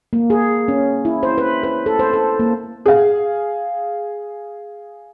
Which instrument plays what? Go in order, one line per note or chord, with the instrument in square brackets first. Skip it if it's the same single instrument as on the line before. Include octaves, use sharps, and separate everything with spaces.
[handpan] A#3
G#4
C#4
E4
C5
B4
B4
A4
C5
A4
A#3
[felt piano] G#4 F5